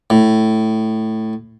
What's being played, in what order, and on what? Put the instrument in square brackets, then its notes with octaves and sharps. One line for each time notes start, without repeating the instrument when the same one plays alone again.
[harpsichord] A2